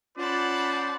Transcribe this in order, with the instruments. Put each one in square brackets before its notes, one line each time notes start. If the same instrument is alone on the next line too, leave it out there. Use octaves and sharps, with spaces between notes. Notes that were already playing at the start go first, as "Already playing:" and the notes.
[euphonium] C#4 [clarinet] F4 [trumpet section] C5 D5 [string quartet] F#5 A5 B5